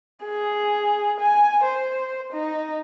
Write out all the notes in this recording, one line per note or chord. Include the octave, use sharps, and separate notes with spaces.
G#4
G#5
C5
D#4